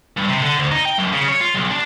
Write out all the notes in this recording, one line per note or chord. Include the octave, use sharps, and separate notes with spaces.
G2
C3
D3
D2
D#4
G5
F#2
C#3
C#5
F4
B1
D4